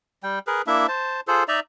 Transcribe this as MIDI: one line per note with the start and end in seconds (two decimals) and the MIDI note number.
0.23 0.39 55
0.23 0.39 79
0.47 0.62 68
0.47 0.62 70
0.47 0.62 71
0.67 0.87 58
0.67 0.87 62
0.67 0.87 64
0.67 0.87 76
0.88 1.20 72
0.88 1.20 81
1.28 1.43 65
1.28 1.43 68
1.28 1.43 69
1.28 1.43 72
1.48 1.60 63
1.48 1.60 74
1.48 1.60 76
1.48 1.60 82